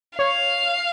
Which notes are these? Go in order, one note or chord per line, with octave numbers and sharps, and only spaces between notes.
C#5 F5